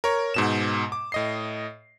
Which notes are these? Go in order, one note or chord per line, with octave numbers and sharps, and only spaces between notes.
A#4 C#5
G#2 B2 E7
D6
A2 D#5 C7